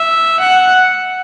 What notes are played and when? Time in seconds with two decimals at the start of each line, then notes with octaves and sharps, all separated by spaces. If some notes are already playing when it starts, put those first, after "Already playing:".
Already playing: E5
0.40 F#5